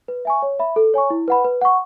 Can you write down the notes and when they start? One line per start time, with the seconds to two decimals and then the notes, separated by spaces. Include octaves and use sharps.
0.08 B4
0.25 E5 G#5 C#6
0.42 C#5
0.59 E5 B5
0.76 A4
0.94 C#5 G#5 C#6
1.10 E4
1.28 B4 F#5 B5
1.44 B4
1.61 F#5 C#6